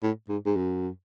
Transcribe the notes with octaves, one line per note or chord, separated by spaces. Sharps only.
A2
G#2
G#2
F#2